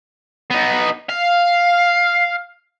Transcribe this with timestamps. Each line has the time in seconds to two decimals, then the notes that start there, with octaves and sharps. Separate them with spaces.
0.51 B3 D#4
1.09 F5